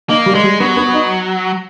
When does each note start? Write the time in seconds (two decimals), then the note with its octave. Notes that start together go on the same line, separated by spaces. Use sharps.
0.09 A#3 D#4
0.26 G3
0.35 G#3
0.44 G3
0.60 F#3 B3
0.77 B3
0.94 D#4